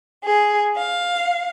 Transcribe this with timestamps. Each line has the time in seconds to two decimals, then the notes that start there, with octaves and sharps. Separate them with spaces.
0.23 G#4
0.76 F5